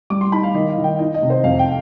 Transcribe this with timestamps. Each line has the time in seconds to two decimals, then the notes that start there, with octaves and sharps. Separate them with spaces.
0.10 G3 D6
0.21 C6
0.32 D#4 B5
0.43 F5
0.54 D#3 D#5
0.70 F5
0.77 D#3
0.84 G5
0.99 D#4 D#5
1.14 D#5
1.22 C3
1.30 C5
1.44 F2 F5
1.59 G5